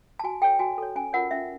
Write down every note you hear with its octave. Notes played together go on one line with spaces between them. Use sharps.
A5
F#4 G#5
A4 C#5 G5
F#4 G#5
A4 C#5
C#4 G#5
F4 A#4 C#5 F#5
C#4 E5